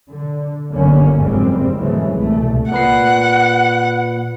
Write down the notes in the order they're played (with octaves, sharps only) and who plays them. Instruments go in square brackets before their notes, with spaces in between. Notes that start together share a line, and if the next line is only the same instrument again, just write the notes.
[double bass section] D3
G1 F#2 D3 A#3 C#4
F#1 F2 G#2 G3 C4
F#2 C#3 E3 G#3 A3
C2 B2 A3
[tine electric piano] A#2 B4 C7 [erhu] F#5